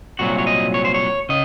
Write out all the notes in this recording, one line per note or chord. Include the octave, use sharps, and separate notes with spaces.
C2 A#2 F#3 F#4
C#5
D#5
C#5
C5
C#5
C#3 D#5